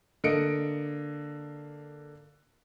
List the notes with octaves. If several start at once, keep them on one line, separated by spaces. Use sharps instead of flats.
D3 A#3 D#5 C#7 D7